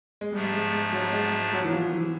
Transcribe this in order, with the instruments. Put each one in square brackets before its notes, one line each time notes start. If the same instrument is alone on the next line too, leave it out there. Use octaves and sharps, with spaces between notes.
[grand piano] G#3
[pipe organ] G#2 F3 A3 D4 [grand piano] G3
[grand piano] G#3
G#3
F#3
G#3
F#3
E3
F3
E3